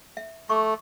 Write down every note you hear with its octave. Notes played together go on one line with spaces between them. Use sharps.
E5
A3 C#6 D6